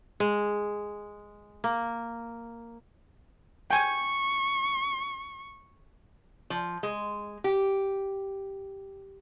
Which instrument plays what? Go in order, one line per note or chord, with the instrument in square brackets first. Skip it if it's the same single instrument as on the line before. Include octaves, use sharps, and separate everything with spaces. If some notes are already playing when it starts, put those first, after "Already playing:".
[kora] G#3
A#3
[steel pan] G5 G#5 [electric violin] C#6
[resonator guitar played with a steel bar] F3
G#3
G4